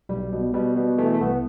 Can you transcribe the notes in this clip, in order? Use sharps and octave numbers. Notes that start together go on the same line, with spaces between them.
B1 G3
B2
B2 G3
B2
E3 A3
A3
C2 B3